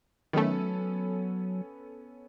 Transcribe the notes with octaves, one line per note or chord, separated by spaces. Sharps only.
D#3 F#3 A3 B3 C#4 A4